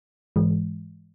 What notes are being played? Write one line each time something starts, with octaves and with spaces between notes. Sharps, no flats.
G#2 E3 G#3